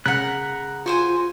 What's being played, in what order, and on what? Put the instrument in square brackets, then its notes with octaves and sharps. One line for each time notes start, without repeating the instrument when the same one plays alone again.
[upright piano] C#3 [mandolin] A#4 F#5 [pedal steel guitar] F#6 [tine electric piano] B6
[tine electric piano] F4 [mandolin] F#4 C5 G#5